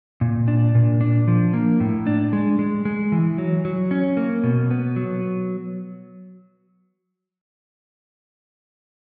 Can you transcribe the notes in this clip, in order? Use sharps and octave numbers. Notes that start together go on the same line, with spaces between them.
A#2
D4
A#2
D4
F3
A#3
A2
D4
G#3
G#3
G#3
E3
F#3
F#3
C#4
A#3
B2
B3
F#3